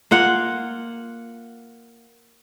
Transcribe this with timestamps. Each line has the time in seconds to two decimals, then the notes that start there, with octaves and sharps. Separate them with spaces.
0.11 A#3 F4 F#5